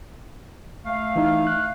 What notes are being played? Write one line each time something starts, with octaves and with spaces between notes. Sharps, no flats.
A3 F5
E3 D#4
F#6